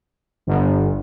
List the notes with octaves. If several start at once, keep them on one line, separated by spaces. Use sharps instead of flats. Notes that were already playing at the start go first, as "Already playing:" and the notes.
G1